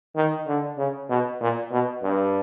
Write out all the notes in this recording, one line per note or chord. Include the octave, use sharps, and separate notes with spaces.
D#3
D3
C#3
B2
A#2
B2
G2